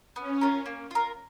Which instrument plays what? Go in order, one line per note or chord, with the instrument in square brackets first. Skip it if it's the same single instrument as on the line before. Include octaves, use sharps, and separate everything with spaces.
[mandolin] B3 [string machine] C#4
[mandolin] F4 A#4
A#3
F4 A#4